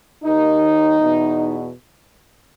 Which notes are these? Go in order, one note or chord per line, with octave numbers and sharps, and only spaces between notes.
D#2 D#3 D#4
E2 B2